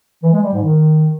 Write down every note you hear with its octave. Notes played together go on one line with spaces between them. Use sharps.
E3
G#3
G3
G#2
D#3